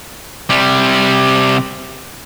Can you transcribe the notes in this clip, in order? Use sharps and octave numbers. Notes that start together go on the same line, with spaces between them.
C3 G3